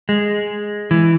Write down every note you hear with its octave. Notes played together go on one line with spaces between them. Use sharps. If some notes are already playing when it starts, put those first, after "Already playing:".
G#3
E3